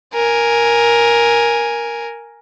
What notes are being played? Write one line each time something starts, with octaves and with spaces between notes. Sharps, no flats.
A#4 G#5